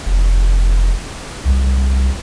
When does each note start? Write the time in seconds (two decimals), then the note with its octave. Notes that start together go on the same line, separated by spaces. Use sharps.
0.06 F1
1.45 C2